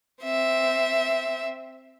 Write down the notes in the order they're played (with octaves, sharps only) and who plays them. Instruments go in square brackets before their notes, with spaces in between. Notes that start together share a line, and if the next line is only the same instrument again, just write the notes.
[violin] C4 E5